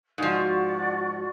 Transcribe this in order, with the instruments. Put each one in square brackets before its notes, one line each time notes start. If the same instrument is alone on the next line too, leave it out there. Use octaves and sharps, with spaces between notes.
[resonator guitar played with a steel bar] G#2 F3 [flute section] F#4 D5